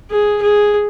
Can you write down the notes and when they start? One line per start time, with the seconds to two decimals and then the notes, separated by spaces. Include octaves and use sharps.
0.10 G#4
0.42 G#4